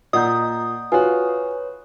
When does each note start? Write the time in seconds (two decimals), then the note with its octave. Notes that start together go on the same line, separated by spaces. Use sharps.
0.13 A#2 D5 D#5 F#5 A#5 D#6 G6
0.92 F4 F#4 B4 C#5 G#5